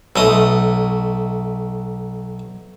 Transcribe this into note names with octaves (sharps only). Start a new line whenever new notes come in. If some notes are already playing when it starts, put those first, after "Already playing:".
B1 A3 D#5